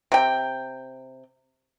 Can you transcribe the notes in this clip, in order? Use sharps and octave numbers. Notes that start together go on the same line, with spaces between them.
C3 G5